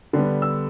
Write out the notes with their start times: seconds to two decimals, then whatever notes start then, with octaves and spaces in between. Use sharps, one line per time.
0.13 D3 G3 B3
0.42 E6